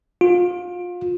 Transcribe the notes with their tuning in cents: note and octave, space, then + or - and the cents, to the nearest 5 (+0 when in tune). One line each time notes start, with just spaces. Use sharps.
F4 +25